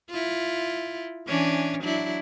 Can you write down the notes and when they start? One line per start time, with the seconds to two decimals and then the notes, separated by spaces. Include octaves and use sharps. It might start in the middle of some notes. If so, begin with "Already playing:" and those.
0.11 E4 F4
1.27 E3 C#4 D4
1.83 F#3 D4 E4